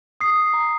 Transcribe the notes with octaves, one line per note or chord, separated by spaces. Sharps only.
D#6 C7
A#5